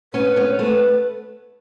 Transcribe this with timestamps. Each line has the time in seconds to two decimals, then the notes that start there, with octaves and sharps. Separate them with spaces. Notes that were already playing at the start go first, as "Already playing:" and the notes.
0.14 B3 C#4 B4
0.36 B3 C#4 C#5
0.50 C5
0.59 A3 B3 B4